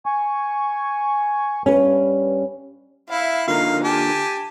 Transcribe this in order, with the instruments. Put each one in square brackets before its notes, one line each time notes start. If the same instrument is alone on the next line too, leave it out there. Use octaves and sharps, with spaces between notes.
[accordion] G#5 C#6
[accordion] G2 [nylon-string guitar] C#4 B4
[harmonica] E4 [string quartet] E5 F5
[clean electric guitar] D3 A#3 F4 [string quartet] D#4 A#4 [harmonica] F5
[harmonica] G4 A5 [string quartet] G#5